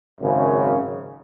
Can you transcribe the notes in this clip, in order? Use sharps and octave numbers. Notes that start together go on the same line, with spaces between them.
G#1 F#2 C#3